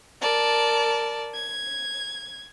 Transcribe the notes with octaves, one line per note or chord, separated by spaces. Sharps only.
A#4 D5 A5
G#6